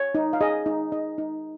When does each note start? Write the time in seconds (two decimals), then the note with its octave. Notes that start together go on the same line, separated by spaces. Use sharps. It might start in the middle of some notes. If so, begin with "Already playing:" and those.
Already playing: C#5
0.15 D#4
0.33 F5
0.41 G#4 D#5
0.66 D#4
0.92 D#4 D#5
1.18 D#4